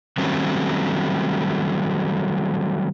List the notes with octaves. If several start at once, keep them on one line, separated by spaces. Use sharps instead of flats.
D#3 F#3 G3 A3 C4 C#4